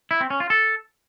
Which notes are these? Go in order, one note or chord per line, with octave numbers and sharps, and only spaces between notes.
E4
C4
C#4
F4
A4